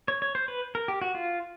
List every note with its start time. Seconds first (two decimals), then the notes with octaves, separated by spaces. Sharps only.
0.08 C#5
0.22 C#5
0.35 C5
0.48 B4
0.75 A#4
0.88 G4
1.02 F#4
1.15 F4